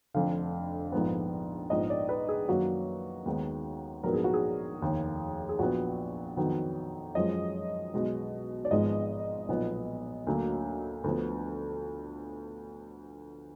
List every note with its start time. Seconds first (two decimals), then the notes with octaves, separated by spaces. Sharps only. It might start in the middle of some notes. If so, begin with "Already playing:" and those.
0.14 F1 F2 D3 F5
0.92 A#1 G#2 F3 B3
1.70 A#1 G#2 F3 B3 D#5
1.90 D5
2.09 B4
2.29 G#4
2.48 F#2 D#3 F#3 A#3 F#4
3.26 D#2 D#3 G#3 B3
4.04 A#1 G#2 F#3 B3 A#4
4.14 G#4
4.24 F#4
4.34 G#4
4.82 F1 D#2 D#3 A#3
5.49 G#4
5.59 A#1 A#2 F#3 B3 F#4
6.37 F2 D#3 F#3 B3
7.15 F#2 F3 G#3 D#5
7.94 B1 B2 G#3 B3
8.65 D5
8.71 G#1 G#2 F3 G#3 B3 D#5
9.49 B1 A#2 F3 B3
10.27 D2 D3 F#3 A#3
11.04 D2 D3 F3 B3